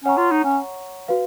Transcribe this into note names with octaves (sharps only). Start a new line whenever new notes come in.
C#4 C#5 F#5 A#5 C#6
F4
D#4
C#4
F#4 B4 F5